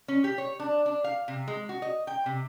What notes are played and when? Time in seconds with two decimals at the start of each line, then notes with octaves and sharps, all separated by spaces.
0.08 C#4
0.24 G4
0.38 C#5
0.60 D4
0.86 D4
1.04 F5
1.28 C3
1.48 G#3
1.69 F#4
1.82 D#5
2.07 G5
2.26 C3